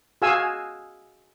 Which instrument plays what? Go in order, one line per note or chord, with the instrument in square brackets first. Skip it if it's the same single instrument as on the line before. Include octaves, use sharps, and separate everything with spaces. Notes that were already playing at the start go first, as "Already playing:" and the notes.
[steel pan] F#4 G#4 F5 G#5 E6